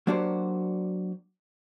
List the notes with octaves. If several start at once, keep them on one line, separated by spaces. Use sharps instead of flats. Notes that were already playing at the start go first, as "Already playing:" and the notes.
F#3 A#3 D4 F#4 G4 C5